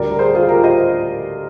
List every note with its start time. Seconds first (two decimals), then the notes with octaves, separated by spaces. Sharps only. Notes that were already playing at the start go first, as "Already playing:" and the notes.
Already playing: D2 D3 G3 A#4 D5
0.11 A#4
0.19 G#4 C5
0.35 F4 G#4
0.49 G4 A#4
0.63 C5 D#5